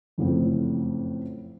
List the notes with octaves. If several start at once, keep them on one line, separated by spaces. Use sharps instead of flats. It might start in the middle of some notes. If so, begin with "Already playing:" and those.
F#1 F2 A2 C4